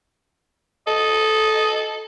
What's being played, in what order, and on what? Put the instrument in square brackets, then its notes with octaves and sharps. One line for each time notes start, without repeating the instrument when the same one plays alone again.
[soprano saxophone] A4 [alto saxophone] D#5